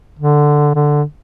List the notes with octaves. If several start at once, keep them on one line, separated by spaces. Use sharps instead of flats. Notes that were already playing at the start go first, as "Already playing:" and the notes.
D3
D3